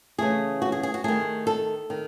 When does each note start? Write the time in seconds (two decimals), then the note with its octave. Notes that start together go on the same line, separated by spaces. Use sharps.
0.18 C#3 E3 A3 G#4
0.62 F#4
0.72 G#4
0.83 G#4
0.94 F#4
1.04 D#3 A3 G#4
1.47 A4
1.90 D#3